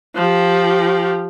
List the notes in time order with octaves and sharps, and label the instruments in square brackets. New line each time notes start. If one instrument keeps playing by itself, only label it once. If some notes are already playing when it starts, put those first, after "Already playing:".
[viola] F3 G4